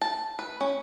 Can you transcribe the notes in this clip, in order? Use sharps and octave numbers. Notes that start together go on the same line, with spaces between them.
A5
B4
C#4